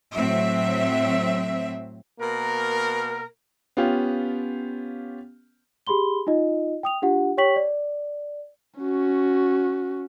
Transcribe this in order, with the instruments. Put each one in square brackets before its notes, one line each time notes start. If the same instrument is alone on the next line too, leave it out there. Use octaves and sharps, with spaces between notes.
[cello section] A2 F#3 C4 E5
[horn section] B2 A#3 A#4
[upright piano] B3 C#4 F4 G4 F5
[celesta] G4 G#4 B5 C6 G7
D#4 F4 D#5
G5 D#6 F7
D4 F4 G4 F#5
G4 C#5 G5 C#6 B6 F#7
D5
[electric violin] C#4 F#4